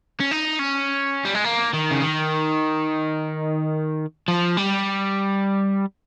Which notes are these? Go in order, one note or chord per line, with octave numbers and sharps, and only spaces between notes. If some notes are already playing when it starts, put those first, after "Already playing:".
C#4
D#4
C#4
G3
G#3
A#3
D#3
C#3
D#3
F3
G3